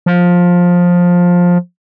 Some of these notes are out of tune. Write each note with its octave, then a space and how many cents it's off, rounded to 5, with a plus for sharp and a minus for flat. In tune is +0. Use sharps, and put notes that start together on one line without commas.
F3 +15